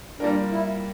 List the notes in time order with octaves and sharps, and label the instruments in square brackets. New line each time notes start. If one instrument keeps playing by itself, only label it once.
[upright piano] G3 A#3 F4 A#4 [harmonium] D4
[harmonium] E4